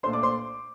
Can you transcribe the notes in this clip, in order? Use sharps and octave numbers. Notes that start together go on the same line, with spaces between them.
A#2 A3 D4 C5 C6
D5 D6
C5 C6